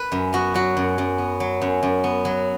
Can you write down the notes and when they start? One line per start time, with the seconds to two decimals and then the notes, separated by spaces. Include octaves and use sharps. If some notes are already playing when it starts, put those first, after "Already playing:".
Already playing: B4
0.12 F#2
0.33 B3 F#4
0.54 F#3 F#4
0.77 F#2
0.98 F#2
1.18 B3
1.40 F#3
1.62 F#2
1.83 F#2
2.04 B3
2.25 F#3